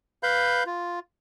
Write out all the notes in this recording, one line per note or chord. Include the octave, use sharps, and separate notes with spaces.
B4 F5 B5 G6
F4